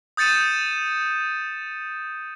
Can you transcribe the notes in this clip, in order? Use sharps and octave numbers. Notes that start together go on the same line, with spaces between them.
D#6 G6 A6 C#7 D#7 E7